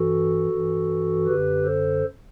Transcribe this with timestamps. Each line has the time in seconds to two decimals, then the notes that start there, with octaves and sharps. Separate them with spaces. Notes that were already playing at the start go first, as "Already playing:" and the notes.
Already playing: G2 E3 F#4 A4
0.50 G2 E3
1.26 F#2 D3 G4 B4
1.65 A4 C5